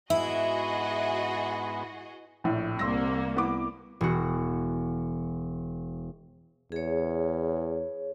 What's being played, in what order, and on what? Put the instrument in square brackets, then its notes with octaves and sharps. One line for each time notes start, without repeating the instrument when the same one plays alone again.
[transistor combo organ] G#2 B3 [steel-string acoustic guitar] E4 [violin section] F#4 G#4 D#5 [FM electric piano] E5
[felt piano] A#1 A2
[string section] C2 A#3 [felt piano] C6 E6 A#6
[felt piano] B3 E4 D6
[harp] E1 F#4
[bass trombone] E2 [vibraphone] G#4 C#5